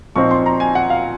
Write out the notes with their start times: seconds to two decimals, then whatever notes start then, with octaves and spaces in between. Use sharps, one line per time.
0.16 A#2 F3 C4 D#4 C#6
0.31 C6
0.46 A#5
0.60 G#5
0.75 F#5
0.90 F5